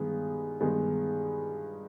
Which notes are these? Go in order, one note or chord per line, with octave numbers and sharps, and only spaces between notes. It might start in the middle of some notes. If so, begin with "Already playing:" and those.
Already playing: G2 D#3 G#3 B3
G2 D#3 G#3 B3